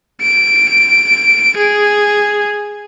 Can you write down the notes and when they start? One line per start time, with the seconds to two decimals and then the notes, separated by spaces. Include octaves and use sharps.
0.21 D7
1.57 G#4